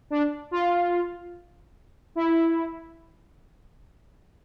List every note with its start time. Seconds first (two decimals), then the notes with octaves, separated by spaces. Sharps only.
0.10 D4
0.51 F4
2.15 E4